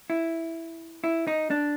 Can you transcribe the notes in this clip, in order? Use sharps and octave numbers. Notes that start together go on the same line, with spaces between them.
E4
E4
D#4
D4